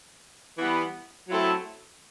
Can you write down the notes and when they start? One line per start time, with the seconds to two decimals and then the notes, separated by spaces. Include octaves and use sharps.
0.58 E3 G3 B3
1.29 F#3 A3 C4 E4 A4